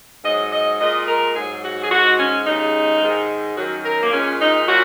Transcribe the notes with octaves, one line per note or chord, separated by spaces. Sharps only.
G#2 F#3 D#5
D#5
A#2 G#3 D#5
A#4
G#2 F#3 G#4
F#4
G#4
G#2 G#3 F#4
C#4
D#2 C#3 G#3 D#4
G#2 D#3 G#3
F#2 D#3 F#3 F#4
A#4
A#3
A#2 G#3 C#4
D#4
A#2 F#3 F#4